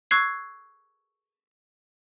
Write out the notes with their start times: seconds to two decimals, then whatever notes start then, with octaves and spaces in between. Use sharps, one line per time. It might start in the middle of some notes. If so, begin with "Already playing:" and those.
0.11 C#6 E6 F#6 G#6 C7